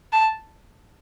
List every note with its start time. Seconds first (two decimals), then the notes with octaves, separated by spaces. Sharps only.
0.13 A5